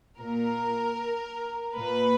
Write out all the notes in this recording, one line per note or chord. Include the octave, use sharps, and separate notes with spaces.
A#2 A#4
A#2 B4